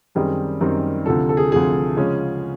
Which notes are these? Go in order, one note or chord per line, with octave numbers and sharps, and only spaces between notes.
F#2 D#3 G3 C4 D#4 G#4
F#2 D#3 G3 C4 D#4
D2 C3 F3 A4
A4
G#4
D2 C3 F3 G#4
C#3 F3 G#3 C#4